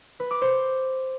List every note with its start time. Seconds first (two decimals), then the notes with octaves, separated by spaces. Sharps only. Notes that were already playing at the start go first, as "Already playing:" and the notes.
0.20 B4
0.31 D6
0.41 C5